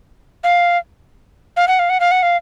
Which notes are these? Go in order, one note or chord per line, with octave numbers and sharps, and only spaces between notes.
F5
F5
F#5
F5
F#5
F5
F#5
F5